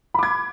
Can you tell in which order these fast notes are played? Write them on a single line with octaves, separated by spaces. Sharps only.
B5 D6 G#6